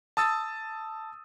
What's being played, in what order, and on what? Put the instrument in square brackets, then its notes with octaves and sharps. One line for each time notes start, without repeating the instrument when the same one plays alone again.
[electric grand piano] A5 D#6 E6 A6